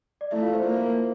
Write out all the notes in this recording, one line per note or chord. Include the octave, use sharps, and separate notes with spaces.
D5
A3 E4 E5
F4 F5
C5
A#3